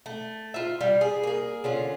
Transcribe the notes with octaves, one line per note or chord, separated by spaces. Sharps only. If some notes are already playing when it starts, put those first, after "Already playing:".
A3
F4 E5
G3 F4
G#4
A#3 G#4
D3 C#4 F4